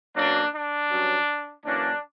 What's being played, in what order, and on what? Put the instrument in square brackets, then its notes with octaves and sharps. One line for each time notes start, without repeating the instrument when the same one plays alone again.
[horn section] B2 F#3 A#3 C#4 D4
D4
G2 F#3 C#4
F#2 E3 A#3 C#4 D4